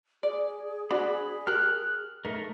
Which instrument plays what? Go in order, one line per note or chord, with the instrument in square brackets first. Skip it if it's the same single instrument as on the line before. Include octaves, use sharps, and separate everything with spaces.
[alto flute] G#4 [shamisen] D5
[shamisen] C4 D4 F#4 [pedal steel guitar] B5
[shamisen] G4 A#4 [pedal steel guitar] F6 F#6
[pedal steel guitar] A3 A#4 [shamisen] D#4